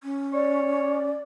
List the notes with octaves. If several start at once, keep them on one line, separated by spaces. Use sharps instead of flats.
C#4
C#5 D5